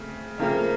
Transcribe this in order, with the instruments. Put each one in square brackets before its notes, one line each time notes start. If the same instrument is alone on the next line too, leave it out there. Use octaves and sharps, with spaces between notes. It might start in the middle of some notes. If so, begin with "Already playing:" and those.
Already playing: [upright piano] C#3 A3 C4
[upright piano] C#3 F3 A3 C4 [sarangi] A#3